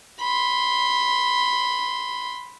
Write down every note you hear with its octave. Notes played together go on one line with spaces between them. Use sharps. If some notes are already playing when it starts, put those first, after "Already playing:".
B5 C6